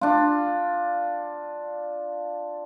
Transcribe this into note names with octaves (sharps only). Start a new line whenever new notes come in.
D4 F4